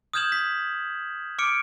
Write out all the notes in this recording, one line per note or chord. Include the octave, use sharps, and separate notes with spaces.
D#6 F6 G6 G#6 E7 F#7
B6
D6 F6 C#7 D7